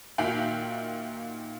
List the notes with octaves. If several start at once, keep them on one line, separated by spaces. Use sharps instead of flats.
A#2 D#3 F#4 E5 F5 G5